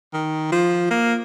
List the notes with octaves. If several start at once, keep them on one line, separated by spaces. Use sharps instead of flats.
D#3
F3
A#3